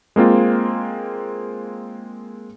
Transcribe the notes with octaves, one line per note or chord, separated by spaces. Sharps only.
G#3 A#3 C4 F4